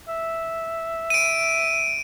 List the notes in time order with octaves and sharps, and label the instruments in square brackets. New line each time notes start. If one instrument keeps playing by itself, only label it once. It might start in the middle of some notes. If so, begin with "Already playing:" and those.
[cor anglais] E5
[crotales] D7 D#7